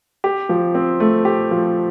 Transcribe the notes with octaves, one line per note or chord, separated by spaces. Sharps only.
G4
F3
C4
A3
G4
F3